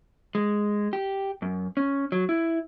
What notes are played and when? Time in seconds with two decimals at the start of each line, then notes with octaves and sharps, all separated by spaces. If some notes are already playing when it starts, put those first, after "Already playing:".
0.35 G#3
0.93 G4
1.42 F#2
1.77 C#4
2.12 F#3
2.29 E4